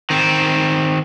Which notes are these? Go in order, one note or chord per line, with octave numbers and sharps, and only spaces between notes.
D#3 C4